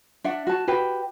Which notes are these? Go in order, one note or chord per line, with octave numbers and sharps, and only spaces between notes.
D4 E5 F#5
F#4 A5
F#4 G4 B4